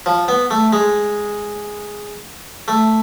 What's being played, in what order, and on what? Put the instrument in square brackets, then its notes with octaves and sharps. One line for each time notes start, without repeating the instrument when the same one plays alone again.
[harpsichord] F3
B3
A3
G#3
A3